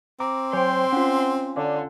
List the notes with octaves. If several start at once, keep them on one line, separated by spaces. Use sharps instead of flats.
C4 A#5 D6
F#3 C5 C#5 G5 G#5 C6
C#4 F4 F#5
D3 C#5 D5 F5